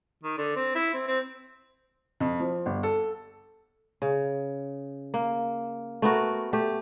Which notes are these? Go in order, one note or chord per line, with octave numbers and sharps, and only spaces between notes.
D#3
D3
C4
E4
C4
C4
F2
F3
G1
A4
C#3
A#3
A3 B3 F#4 A#4
A3 G4